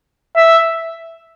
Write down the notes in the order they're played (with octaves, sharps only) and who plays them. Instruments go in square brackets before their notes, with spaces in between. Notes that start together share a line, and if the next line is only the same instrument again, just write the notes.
[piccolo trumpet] E5